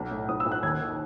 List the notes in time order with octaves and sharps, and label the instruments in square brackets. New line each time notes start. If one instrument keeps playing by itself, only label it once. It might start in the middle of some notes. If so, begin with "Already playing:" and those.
Already playing: [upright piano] B1
A2
B1 D#6
E6
B1
F#6
D#2 G#6
D#3